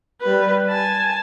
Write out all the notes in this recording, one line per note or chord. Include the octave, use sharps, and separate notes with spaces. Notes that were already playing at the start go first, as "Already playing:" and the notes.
G3 B4
G#5 A5